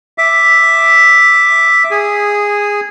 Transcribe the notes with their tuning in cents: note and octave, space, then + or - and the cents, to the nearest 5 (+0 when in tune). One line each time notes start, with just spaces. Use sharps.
E5 +0 D6 +0
G#4 -15 D#6 +0